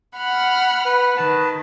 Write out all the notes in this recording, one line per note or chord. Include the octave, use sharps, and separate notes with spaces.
F#5 B5 F6
B4
D#3 B4 A5